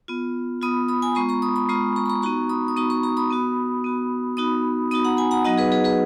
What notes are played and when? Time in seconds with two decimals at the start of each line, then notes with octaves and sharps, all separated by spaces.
0.08 B3 F4
0.62 B3 F4 B5 D#6
0.89 B5 D#6
1.02 G#5 B5
1.15 G#3 B3 F4 A#5 C#6
1.29 A#5 C#6
1.42 B5 D#6
1.56 B5 D#6
1.69 G#3 B3 F4 A#5 C#6
1.96 A#5 C#6
2.06 B5
2.10 A#5 C#6
2.22 B3 D#4 F#4 A#5 C#6
2.50 B5 D#6
2.68 D#6
2.76 B3 D#4 F#4 A#5 C#6
2.90 A#5 C#6
3.03 A#5 C#6
3.17 B5 D#6
3.31 B3 F#4
3.84 B3 F#4
4.37 B3 D#4 F#4 B5 D#6
4.91 B3 D#4 F#4 B5 D#6
5.05 F#5 A#5
5.17 G#5 B5
5.31 F#5 A#5
5.45 F#3 B3 D#4 F#4 D#5 F#5
5.58 G#4 B4
5.72 G#4 B4
5.84 G#4 B4